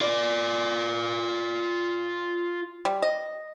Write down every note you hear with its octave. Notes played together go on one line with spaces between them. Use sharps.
F4 D5
G3
D#5